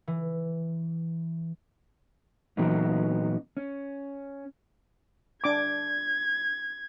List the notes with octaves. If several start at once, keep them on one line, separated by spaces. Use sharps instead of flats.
E3
A#2 E3 F#3 B3 C#4 D#4
C#4
D4 D6 G#6